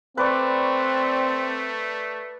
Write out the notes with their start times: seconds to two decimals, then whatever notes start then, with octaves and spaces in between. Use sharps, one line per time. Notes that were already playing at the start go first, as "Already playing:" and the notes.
0.17 A3 C4 B4 D5 C#6